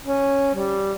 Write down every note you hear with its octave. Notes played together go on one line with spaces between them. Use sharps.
C#4
G3